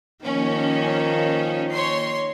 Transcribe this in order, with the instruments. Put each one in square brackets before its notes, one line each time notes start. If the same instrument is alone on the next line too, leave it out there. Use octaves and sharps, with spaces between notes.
[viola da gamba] D#3 [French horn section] F3 A#3 [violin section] C#4
[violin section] C#5 C6 C7